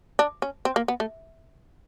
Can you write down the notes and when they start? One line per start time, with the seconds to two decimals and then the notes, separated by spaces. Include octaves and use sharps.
0.19 D4
0.42 C#4
0.65 C4
0.76 A#3
0.88 B3
1.00 A3